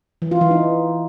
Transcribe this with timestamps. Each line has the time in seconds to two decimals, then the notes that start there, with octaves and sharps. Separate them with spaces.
0.22 E3
0.31 F4
0.41 E3
0.51 D#4